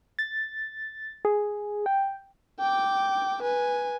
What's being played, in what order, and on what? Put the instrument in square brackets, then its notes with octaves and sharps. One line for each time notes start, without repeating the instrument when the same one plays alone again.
[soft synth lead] A6
G#4
G5
[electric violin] G5 D6
B4 G#5